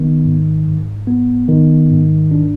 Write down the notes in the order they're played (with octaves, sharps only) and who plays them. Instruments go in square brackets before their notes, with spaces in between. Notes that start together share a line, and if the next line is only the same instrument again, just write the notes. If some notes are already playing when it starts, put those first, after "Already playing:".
Already playing: [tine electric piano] D#3 B3
G#2
G#2
B3
D#3
G#2
D4